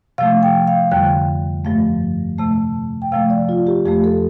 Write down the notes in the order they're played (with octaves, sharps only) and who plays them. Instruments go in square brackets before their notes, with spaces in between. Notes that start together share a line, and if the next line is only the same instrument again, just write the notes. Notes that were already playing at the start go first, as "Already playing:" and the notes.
[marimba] C3 F3 A3 F5
G5
F5
F2 D3 G3 G5
G2 F3 A3
C3 A3 A5
G5
C3 F3 A3 F5
D5
F4
G4
F2 F3 A3 G4
A4